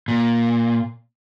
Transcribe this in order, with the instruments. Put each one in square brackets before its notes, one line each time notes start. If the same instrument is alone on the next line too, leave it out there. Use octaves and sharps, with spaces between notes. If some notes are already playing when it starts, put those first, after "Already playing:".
[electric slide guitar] A#2